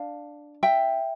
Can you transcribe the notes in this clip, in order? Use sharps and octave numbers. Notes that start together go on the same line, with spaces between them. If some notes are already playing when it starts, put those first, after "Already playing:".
Already playing: D4 F5 A5
E5 G5